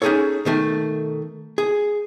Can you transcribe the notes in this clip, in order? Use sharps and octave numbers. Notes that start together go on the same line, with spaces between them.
C#4 D#4 F4 G#4 A4 C#5
B2 D#3 A3
G#4